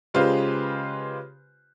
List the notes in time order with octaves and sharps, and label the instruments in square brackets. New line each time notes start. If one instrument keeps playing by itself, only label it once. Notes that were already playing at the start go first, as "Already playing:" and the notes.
[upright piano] C#3 G#3 F4 G4 B4 C5